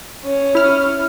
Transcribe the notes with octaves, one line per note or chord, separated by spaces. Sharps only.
C#4
E4 F6